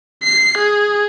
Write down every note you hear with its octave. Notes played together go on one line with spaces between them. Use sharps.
C7
G#4